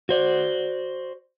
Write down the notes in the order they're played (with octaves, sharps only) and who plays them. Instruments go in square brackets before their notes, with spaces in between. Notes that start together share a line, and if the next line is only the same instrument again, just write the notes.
[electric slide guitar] F#4 C5 D5